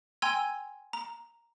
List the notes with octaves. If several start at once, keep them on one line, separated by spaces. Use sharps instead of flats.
G5 G#5 A#5 C6 E6 G#6
A#5